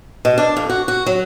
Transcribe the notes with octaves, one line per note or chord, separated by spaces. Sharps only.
B2
D4
F2
F#4
F#4
F#3